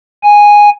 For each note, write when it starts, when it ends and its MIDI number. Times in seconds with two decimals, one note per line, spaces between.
0.24 0.69 80